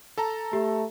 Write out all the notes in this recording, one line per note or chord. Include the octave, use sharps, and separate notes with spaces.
A4 A5 A#5
A3 G4